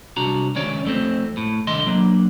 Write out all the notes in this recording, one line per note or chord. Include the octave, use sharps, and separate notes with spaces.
C2 D4 F#4 A#5
C#2 D#3 C#4 C#5 D5
F2 A3 C4
A2
C2 D3 D#3 D#5 C6
F#3 A#3 D4